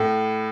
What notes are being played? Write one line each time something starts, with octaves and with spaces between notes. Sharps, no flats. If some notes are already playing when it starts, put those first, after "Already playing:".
Already playing: A2